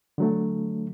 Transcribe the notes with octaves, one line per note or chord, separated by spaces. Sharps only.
D3 F#3 A3